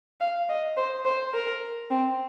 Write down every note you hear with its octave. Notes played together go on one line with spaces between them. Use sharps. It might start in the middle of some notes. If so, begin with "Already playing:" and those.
F5
D#5
C5
C5
A#4
C4